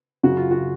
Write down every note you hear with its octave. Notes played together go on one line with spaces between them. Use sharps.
F#2 C#3 F#4
F4
F#4